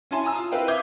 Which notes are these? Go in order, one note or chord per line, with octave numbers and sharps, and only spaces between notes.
C#4 E4 G#5 A5 C6
G#5 A#5 D#6 E6
F4
C4 E4 B4 F5 G5
E5 F5 D6 D#6 G6 G#6